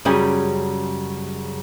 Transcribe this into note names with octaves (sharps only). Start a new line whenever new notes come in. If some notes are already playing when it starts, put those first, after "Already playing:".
F#2 C#3 G3 C#4 G4 G#4